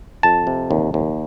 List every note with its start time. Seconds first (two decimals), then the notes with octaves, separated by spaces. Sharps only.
0.23 F2 A5
0.47 C3
0.71 D#2
0.94 D#2